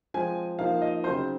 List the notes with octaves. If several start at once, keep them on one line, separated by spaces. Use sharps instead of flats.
F3 G#3 C4 G#5
F3 A#3 D#4 F5
D#5
C#3 F#3 C4 D#4 C5